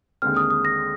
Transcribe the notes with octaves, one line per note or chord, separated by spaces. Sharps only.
D#2 D3 G#3 C4 F6
D#6
D#6
A#6